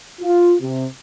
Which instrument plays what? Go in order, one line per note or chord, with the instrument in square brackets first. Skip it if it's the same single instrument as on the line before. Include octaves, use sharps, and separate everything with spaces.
[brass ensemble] F4
C3